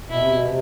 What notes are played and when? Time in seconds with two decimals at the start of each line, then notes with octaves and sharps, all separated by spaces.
0.10 B2 E4
0.20 C3
0.29 B2
0.44 C3